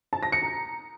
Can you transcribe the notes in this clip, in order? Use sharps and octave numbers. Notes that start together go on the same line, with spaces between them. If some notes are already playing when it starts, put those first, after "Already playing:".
A5
A#6
C#7
A#5